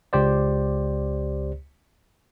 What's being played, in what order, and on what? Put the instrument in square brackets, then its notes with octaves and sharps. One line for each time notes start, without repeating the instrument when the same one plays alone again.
[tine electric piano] C#2 G4 C5 D5